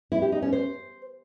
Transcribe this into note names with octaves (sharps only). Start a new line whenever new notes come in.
E4
G4
D#4
C#4
C5